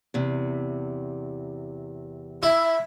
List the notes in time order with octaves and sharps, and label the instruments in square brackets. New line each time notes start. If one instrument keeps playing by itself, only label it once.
[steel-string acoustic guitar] E2 C3
[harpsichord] E4 [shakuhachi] E5